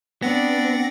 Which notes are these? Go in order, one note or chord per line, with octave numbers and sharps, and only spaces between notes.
B3 C4 D4 D5 F#5 A#6